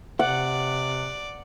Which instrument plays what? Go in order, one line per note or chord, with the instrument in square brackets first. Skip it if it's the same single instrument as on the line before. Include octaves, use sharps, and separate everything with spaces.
[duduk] C3 [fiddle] D5 [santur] F#5